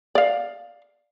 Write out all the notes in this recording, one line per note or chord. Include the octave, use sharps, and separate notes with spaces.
D5 F5